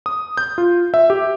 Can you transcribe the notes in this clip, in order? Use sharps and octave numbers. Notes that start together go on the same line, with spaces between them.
D#6
G6
F4
E5
G4